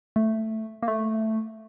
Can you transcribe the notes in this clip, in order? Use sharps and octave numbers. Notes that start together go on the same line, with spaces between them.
A3
A#3
A3